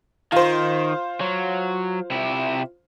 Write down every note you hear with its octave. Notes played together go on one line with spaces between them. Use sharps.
D#3 F4 C5
F#3
C3 E4